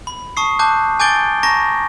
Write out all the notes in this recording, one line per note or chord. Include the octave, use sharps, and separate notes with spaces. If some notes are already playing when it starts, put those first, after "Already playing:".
B5
A5 C#6 D#6 C7
A5 D6 F#6 G6
G#5 D6 G6 A6 D7 G7
A5 A#5 C#6 A#6